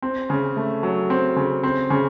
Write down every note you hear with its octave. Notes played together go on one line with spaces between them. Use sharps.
C4
C#3
A3
F#3
C4
C#3
C4
C#3